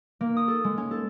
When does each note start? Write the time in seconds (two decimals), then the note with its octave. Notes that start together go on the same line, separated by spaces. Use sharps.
0.21 A#3
0.37 D#6
0.48 A4
0.64 G#3
0.77 C#4
0.91 A4